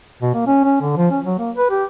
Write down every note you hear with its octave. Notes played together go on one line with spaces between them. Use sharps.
B2
A#3
C#4
C#4
D3
F3
C#4
F#3
A#3
B4
G4